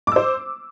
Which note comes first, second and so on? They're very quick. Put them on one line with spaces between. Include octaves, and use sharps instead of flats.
D6 E6 C5